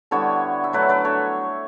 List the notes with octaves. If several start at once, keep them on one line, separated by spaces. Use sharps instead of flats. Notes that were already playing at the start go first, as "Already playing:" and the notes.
D3 G3 B3 E4 A4 C#5
E5
F#3 A3 D4 B4 D5
B4 D5
A4 C#5